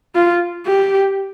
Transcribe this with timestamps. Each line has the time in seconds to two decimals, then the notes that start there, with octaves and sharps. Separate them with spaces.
0.15 F4
0.66 G4